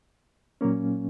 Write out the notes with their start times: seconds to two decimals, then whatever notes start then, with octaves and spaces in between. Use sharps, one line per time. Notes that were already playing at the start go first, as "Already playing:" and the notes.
0.61 A#2 F#3 A#3 C#4